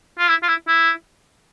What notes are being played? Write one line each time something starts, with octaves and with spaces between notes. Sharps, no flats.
F4
E4
F4
E4
E4